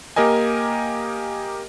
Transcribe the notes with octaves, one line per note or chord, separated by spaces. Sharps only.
A#3 G4 A#4 D#5 G#5